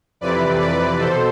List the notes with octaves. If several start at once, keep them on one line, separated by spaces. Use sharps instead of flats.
F2 C3 E3 B4 D5
B4 D5
B2 A4 C5